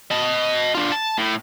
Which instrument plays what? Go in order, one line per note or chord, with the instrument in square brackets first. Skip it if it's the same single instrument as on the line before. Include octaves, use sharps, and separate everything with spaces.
[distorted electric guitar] D#5 A5
D4 F4
A5
A2